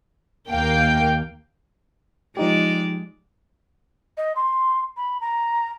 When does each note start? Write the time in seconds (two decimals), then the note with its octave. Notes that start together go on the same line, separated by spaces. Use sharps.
0.50 D#2 A#3 F5 G5
2.37 F3 G#3 D#4 G4 D5
4.17 D#5
4.36 C6
4.97 B5
5.21 A#5